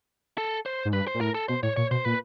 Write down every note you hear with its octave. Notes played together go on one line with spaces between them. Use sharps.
A4
C5
G#2
G2 B4
C5
A#2
A2 A#4
A4
B2 C5
A2 C#5
A#2 C#5
B2 C5
A#2 B4